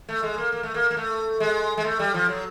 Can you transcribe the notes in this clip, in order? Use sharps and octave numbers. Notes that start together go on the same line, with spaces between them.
A3
G#3
A#3
A#3
A3
A#3
A#3
A3
G#3
G#3
A3
G3
F3
F#3